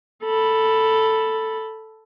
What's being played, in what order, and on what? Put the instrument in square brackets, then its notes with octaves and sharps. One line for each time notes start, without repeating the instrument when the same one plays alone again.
[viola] A4 B5